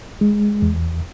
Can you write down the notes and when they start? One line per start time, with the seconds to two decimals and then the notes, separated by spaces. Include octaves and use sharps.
0.21 G#3
0.62 E2